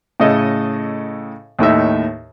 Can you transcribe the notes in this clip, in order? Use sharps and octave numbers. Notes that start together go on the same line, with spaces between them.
A2 C#3 A4 D#5
D#2 A2 D#4 E5